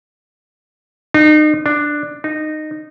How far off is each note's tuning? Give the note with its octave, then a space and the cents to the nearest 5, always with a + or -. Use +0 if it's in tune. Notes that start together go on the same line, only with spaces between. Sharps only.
D#4 -35
D4 +10
D#4 -15